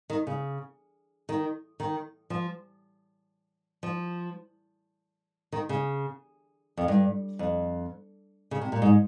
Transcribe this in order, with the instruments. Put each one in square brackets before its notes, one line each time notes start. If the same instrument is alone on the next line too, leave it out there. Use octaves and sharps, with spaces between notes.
[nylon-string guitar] D#3
C#3
D#3
D#3
F3
F3
D#3
C#3
F2
G2
F2
C#3
C3
A#2
G#2